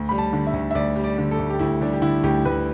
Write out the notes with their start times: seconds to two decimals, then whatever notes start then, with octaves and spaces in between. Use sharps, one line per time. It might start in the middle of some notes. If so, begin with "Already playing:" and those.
Already playing: D2
0.09 G3 B5
0.18 A5
0.33 D3
0.47 E5
0.53 D2
0.71 E5
0.75 D2 D5
0.96 G3
1.04 D5
1.18 D3
1.31 A4
1.39 D2
1.50 G4
1.59 D2 E4
1.81 G3 D4
1.93 G4
2.02 D3 E4
2.23 D2 G4
2.45 D2 B4